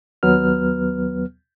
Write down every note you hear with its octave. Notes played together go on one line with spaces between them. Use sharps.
D#2 F#3 B3 B4 F6